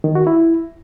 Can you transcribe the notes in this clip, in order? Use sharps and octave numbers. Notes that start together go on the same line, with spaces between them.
D#3
F#4
E4